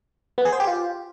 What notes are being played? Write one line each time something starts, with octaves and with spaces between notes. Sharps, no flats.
B3
G#4
C5
G4
F4